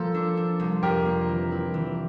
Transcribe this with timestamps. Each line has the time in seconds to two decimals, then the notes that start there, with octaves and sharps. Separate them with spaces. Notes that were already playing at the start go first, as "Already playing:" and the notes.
Already playing: F3 A#3 A4
0.14 D4
0.37 D4
0.59 C2
0.83 F2 G4 A#4
1.05 A#3
1.29 E3
1.52 E4
1.74 E3